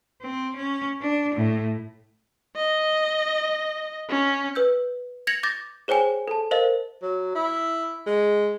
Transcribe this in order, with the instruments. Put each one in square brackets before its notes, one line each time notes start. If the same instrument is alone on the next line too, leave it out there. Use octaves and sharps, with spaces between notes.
[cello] C4
C#4
D4
A2
[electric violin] D#5
C#4
[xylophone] B4 E6 G6
G#6 A#6 C#7 F7 F#7
D6 G6 A6 A#6
G#4 C5 C#5 G5 G#5
A4 A5
A#4 C5 D#5 F5
[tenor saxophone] F#3
E4
G#3